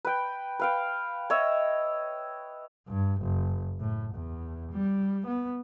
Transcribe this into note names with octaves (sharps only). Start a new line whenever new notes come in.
B4 G5
B4 F5 G5
C#5 D#5 E5
G2
F#1
A2
E2
G3
B3